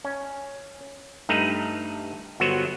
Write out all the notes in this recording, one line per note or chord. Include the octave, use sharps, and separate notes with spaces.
C#4
G2 A3 D#4 B4 A#5
G1 F#3 B3 F#4 C5